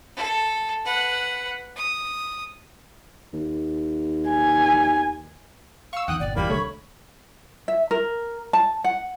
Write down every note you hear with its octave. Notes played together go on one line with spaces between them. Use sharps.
A4
B4 F#5
D#6
D#2
G#5
F5 C#6 E6
E2 D#3 F#5 G5 D#6 F#6
G1 A#2 D5
E2 G3 A#3 B5
C2 D3 A3 C#5
E5
A#4
A5
F#5